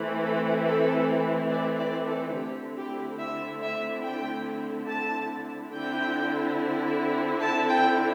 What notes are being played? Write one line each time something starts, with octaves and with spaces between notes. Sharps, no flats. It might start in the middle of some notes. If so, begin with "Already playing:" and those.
Already playing: E3 A3 C4
A4
A4
D5
D5
A4
D3 A3 C4 E4 G4
G4
E5
E5
G5
A5
D3 C4 E4 G5
A5
G5